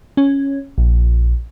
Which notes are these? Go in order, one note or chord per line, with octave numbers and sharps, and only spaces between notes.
C#4
A#1